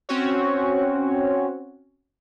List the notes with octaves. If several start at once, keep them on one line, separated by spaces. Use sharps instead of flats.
C4 C#4 F#4 C#5